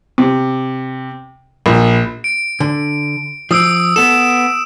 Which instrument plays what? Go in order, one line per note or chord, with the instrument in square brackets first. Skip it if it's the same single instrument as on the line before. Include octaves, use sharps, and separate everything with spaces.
[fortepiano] C3
A#1
[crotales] D7
[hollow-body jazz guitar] D3
[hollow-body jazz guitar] F3 [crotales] D#6 E6 D7
[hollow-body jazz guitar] B3 A4 [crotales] E7